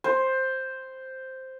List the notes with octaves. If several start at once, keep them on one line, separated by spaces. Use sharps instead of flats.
C5